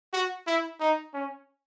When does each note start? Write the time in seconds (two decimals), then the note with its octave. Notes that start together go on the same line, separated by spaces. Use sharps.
0.13 F#4
0.47 E4
0.80 D#4
1.14 C#4